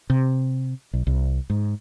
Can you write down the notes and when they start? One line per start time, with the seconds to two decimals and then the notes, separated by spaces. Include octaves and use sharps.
0.10 C3
0.93 B1
1.07 C2
1.50 G#2